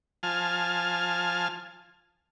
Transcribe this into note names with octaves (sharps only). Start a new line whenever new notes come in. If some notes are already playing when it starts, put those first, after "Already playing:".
F3 G#5 A5 F6